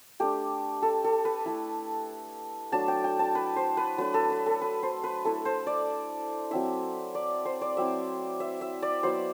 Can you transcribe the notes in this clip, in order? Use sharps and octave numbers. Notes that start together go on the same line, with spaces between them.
A3 D4 G4
A4
A4
B4
A3 E4
F#3 A3 D4 A5
G5
G5
A5
B4
C5
B4
F#3 A3 D4 B4
A4
B4
A4
B4
C5
B4
A3 E4 A4
C5
D5
F#3 C4 E4 E5
D5
C5
D5
F#3 C4 E4 E5
E5
E5
D5
F#3 B3 E4 C5